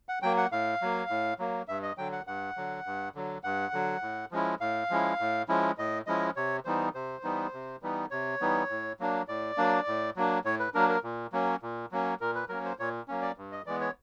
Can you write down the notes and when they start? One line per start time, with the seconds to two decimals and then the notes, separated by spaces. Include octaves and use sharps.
0.09 F#5
0.22 F#3 A#3 G5
0.37 F#5
0.51 A2 F5
0.82 F#3 A#3
1.10 A2
1.39 F#3 A#3
1.68 G2 E5
1.83 D#5
1.98 D3 F#3 G5
2.12 F#5
2.27 G2 F#5
2.57 D3 F#3
2.86 G2
3.15 D3 F#3
3.44 G2 F#5
3.73 D3 F#3
4.02 A2
4.31 F3 G#3 C#4 E4
4.60 A2 F5
4.90 F3 G#3 C#4 E4
5.20 A2
5.48 F3 G#3 C#4 E4
5.78 A2 D#5
6.06 F3 G#3 C#4 E4 D#5
6.36 C3 C#5
6.65 E3 G3 B3 D#4 C5
6.94 C3 C5
7.23 E3 G3 B3 D#4
7.53 C3
7.82 E3 G3 B3 D#4
8.11 C3 C#5
8.41 E3 G3 B3 D#4
8.69 A2
9.00 F#3 A#3 D4
9.28 A2 D5
9.57 F#3 A#3 D4
9.87 A2
10.16 F#3 A#3 D4
10.45 A2 C#5
10.60 B4
10.74 F#3 A#3 D4 A#4
10.89 A#4
11.03 A#2
11.32 F#3 A#3 C#4
11.62 A#2
11.92 F#3 A#3 C#4
12.20 A#2 A#4
12.35 B4
12.49 F#3 A#3 C#4 A#4
12.65 C5
12.79 A#2 C#5
13.08 F#3 A#3 C#4
13.22 D5
13.38 G2
13.52 D#5
13.66 E3 G#3 B3 D5
13.81 C#5